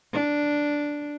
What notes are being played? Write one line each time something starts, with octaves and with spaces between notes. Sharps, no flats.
D4